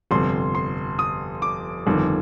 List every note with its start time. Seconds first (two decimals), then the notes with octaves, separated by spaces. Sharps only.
0.11 G1 F2 C3 C6
0.55 C6
0.99 D#6
1.42 D6
1.87 G1 F2 D#3